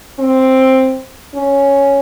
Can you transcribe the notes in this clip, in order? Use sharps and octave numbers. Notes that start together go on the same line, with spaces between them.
C4
C#4